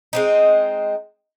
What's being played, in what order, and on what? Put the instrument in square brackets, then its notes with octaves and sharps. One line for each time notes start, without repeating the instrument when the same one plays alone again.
[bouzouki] G#3 C4 D#4